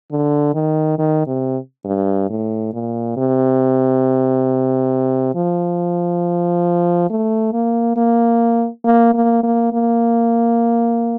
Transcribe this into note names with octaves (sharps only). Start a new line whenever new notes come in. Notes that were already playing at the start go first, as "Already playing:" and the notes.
D3
D#3
D#3
C3
G2
A2
A#2
C3
F3
A3
A#3
A#3
A#3
A#3
A#3
A#3